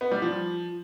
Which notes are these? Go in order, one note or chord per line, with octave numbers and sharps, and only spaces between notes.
B3
G3
F3